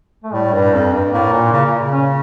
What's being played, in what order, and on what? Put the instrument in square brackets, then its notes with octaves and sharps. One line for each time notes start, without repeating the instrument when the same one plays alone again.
[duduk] A3
[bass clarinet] A2 [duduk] G3
[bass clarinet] G2
F2
G2
[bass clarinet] A2 [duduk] A#3
[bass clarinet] A#2
C#3
A#2
C#3
[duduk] C#4